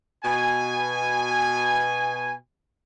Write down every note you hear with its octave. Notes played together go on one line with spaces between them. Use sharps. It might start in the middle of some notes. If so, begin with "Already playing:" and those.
B2 G#5